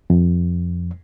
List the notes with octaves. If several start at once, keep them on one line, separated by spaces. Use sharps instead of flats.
F2